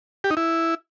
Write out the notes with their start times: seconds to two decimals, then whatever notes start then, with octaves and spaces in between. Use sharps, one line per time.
0.24 G4
0.31 D#4
0.37 E4